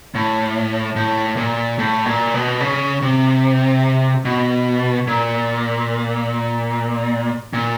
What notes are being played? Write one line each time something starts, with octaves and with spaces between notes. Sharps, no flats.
A2
A2
A#2
A2
A#2
B2
C#3
C3
B2
A#2
A#2